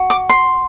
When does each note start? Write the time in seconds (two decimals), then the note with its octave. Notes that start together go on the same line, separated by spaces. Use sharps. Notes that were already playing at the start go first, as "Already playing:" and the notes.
Already playing: F#4
0.10 D6
0.29 C6